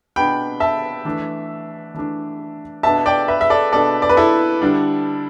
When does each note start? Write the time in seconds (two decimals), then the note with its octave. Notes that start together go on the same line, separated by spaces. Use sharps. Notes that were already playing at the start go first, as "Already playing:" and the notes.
0.16 B2 B3 D4 G5 B5
0.60 E5 A5
1.05 E3 A3 D4
1.94 E3 A3 D4
2.83 B2 B3 D4 E5 A5
3.06 D5 G5
3.28 B4 E5
3.41 E5
3.50 A4 D5
3.72 B2 B3 D4 A4 D5
4.02 D5
4.09 B4
4.17 E4 A4
4.62 D3 G3 D4